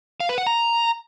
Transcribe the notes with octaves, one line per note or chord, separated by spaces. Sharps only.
F5
B4
F#5
A#5